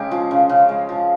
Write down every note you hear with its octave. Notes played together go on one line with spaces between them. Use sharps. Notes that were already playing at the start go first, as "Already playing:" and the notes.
Already playing: C#3 G#3 G4
F3 F4
C#3
C#3
G#3
F3